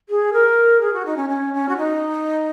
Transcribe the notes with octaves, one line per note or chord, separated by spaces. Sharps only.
G#4
A#4
G#4
F#4
D#4
C#4
C#4
C#4
F#4
D#4